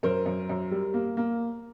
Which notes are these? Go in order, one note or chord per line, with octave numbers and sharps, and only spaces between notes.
F#2 A#4 C5
F#2
F#2
G3
A#3
A#3